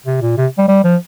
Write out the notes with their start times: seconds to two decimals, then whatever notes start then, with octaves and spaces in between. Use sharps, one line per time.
0.06 C3
0.21 A#2
0.37 C3
0.58 G3
0.69 G3
0.84 F3